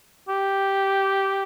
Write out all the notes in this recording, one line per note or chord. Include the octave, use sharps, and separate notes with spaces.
G4